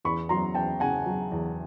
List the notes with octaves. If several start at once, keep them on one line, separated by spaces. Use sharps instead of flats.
E2 B5 C#6
F#3 A#5 C6
E2 G5 A5
C#3 F#5 G#5
F#3
E2